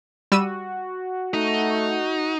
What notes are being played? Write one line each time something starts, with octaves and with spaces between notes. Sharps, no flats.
G3 F#4 E6 D#7
A3 D#4